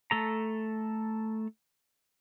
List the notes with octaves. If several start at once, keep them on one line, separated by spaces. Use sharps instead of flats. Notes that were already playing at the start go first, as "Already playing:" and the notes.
A3 A4 A#5